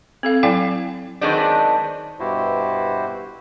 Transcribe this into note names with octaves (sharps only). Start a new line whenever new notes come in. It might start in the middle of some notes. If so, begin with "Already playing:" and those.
C4 A4 F5
F#3 E4 D5 F5 G5 G#5
D#3 F#3 G#3 B3 C4 D4
G2 B2 E4 F#4 G4 C5